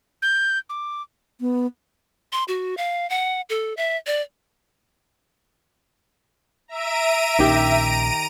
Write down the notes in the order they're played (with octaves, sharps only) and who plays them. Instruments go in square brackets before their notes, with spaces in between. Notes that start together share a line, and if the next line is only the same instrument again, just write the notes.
[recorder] G6
D6
[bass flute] B3
[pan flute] C6
F#4
F5
F#5
A4
E5
D5
[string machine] E5 [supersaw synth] A#5 D7 D#7
[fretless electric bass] A#1 A#2 C#4 [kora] D#3 G4